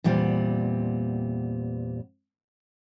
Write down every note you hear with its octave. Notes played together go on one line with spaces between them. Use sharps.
E2 A#2 G3 A3 B3 C4